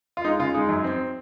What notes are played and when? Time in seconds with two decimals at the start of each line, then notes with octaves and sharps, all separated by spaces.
0.17 F4
0.24 G#3 D#4
0.39 C#3 F4
0.54 G#3 D#4
0.69 F#2
0.84 C4